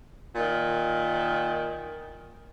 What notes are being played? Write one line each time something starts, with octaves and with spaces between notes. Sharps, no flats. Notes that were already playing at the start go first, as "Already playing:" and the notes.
A#2 D#3